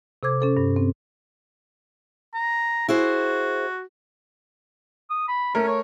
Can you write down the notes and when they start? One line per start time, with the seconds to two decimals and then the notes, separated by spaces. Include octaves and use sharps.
0.23 C3 A4 C5 D6 G#6
0.41 C#4 A4 C5
0.57 G2
0.76 C4
2.34 A#5
2.88 E4 F#4 G#4 C5
5.10 D#6
5.28 B5
5.55 A3 C#4 A#4
5.67 C#5